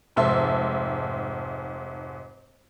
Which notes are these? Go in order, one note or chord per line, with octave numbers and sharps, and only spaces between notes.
F1 G#2 E5 A5 C6